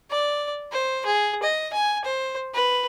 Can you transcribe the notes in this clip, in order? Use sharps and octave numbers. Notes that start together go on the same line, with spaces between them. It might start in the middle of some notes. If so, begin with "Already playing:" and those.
D5
C5
G#4
D#5
G#5
C5
B4